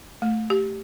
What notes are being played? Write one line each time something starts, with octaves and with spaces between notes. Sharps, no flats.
A3
G4